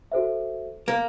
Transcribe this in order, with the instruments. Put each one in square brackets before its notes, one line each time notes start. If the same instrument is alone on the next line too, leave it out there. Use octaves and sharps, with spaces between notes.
[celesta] F#4 A4 C5 E5
[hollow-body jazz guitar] A#3